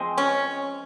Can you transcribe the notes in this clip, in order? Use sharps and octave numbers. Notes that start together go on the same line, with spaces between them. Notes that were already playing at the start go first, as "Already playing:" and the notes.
Already playing: F3 G#3 C4
C#4